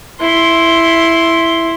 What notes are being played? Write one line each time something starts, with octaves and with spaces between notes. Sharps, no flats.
E4 C6